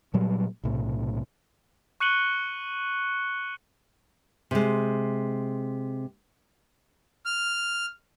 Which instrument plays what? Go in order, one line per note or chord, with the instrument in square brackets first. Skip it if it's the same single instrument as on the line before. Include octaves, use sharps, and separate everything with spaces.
[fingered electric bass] A#2 F#3 G3
B1 A2 C3
[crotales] C#6 F#6 C#7 D#7 F#7 G7
[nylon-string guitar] C3 G#3
[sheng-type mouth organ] F6